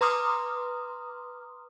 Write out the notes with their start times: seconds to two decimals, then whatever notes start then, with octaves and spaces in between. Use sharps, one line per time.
0.01 B4 A#5 C6 D6 D#6 F6